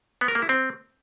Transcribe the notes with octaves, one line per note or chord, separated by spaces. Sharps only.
B3
A#4
A#3
E4
C4